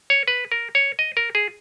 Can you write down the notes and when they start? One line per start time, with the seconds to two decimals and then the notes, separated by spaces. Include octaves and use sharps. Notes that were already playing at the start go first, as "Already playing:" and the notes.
0.10 C#5
0.28 B4
0.52 A#4
0.75 C#5
0.99 D#5
1.17 A#4
1.35 G#4